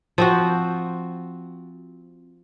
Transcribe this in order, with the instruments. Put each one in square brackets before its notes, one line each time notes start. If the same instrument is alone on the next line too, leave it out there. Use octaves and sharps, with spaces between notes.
[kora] F3 C4 F#4